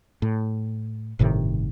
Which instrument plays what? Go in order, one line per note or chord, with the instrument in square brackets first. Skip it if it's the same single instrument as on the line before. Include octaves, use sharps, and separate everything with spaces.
[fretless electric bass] A2
G1 A2 C3 D#3